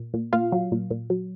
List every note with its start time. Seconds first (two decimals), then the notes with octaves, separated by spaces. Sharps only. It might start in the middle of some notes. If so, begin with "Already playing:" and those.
Already playing: A#2
0.14 A#2
0.33 A#2 F4 F5
0.52 F#3
0.72 A#2
0.91 A#2
1.10 F#3